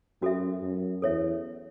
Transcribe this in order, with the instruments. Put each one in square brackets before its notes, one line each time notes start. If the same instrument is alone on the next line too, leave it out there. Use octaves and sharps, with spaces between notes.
[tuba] F#2 [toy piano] C#4 F#4 A4 E5
[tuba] F#2
[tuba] E2 [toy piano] A4 C#5 E5